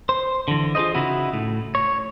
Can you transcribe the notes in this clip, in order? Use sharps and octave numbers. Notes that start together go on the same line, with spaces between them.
C5
D3 E3
F4 G#4 B4 C5 D#5
C#3 D#4 E4 F#4
A2
C#5